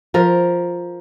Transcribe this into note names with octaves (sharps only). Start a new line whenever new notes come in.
F3 A#4